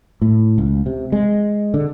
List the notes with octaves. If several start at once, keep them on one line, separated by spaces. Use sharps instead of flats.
A2
C#2
C3
G#3
D3